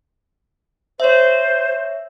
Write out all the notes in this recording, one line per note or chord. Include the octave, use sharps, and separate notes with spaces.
C5 C#5 E5